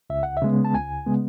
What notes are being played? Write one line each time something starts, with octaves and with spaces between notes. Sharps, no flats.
C#2 E5
F#5
E5
C#3 G#3 B3
A5
C#2 G#5
C#3 G#3 B3